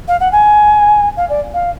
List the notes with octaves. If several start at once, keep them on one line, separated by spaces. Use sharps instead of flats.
F5
F#5
G#5
F5
D5
F5